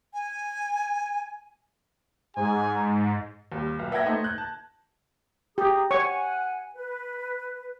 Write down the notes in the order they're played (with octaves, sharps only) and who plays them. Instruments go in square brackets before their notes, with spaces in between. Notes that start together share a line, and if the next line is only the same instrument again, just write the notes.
[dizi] G#5
[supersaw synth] G#2 [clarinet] G#4 [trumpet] G#5
[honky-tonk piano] D#2 G3
B1
B4 E5 F#5 G5 G#6 A#6
A3 D#4 C5
F#6 G6
A5
[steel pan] G4 [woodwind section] G#4 A#5 D#6
[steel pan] C#5 C#6 [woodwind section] F#5 G#5
[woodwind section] B4